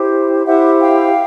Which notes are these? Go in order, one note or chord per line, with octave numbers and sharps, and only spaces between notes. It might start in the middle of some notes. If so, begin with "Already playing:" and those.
Already playing: E4 G4 C5
E4 G4 C5 E5 F#5
F5 G5